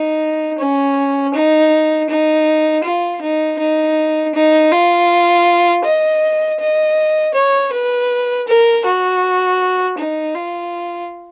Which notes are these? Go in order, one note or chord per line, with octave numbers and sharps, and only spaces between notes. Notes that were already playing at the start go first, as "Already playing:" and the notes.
Already playing: D#4
C#4
D#4
D#4
F4
D#4
D#4
D#4
F4
D#5
D#5
C#5
B4
A#4
F#4
D#4
F4